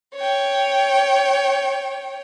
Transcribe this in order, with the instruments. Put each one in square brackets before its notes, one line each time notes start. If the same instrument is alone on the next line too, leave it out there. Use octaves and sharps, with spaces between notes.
[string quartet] C#5 G5